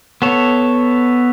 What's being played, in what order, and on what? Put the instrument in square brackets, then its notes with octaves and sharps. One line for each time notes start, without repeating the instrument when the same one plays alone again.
[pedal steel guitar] B3 A4 C#5